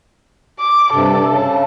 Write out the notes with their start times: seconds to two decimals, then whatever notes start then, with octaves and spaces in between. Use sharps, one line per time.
0.59 D6
0.92 G2 C3 A4
1.30 C#3